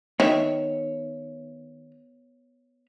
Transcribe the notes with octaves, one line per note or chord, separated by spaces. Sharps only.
D#3 B3 C#5 E5